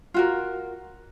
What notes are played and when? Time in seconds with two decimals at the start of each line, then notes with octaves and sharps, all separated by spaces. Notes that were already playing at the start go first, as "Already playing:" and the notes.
0.14 F4 F#4 A#4